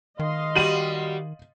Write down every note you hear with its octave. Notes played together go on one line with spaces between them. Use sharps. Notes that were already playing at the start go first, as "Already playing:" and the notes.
D#3 D#5 F5 C6
G3 F#4 D#7 F#7